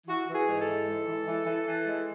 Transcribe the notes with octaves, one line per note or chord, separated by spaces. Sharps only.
E3 F#4
E3
G#4
G#2
A4
E3
G#3
E3
E3
E3
E3
G#3